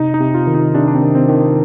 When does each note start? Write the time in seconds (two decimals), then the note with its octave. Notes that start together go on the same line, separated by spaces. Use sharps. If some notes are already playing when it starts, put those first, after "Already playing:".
Already playing: C3 D#4
0.14 D#4
0.20 C3
0.34 F4
0.47 D#3
0.54 D#4
0.74 C3 D4
0.88 D4
0.95 C4
1.02 D#3
1.15 C4
1.28 D#3